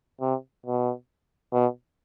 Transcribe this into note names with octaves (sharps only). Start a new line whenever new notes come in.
C3
B2
B2